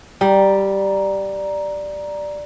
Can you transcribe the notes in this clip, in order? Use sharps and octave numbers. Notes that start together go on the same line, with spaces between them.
G3 D5 A#5